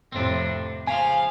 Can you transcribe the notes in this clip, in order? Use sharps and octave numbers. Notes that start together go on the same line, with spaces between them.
F2 A2 C3 C4 D4
C#3 F3 F5 G#5